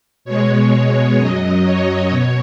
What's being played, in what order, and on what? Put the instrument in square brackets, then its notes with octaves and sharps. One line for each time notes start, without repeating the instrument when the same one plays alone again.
[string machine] B2 G#3 C#5
F#2 F#3 D#5
C#5
B2 C#5